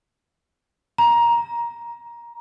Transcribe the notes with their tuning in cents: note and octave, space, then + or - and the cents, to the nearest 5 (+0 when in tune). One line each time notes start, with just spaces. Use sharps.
A#5 +15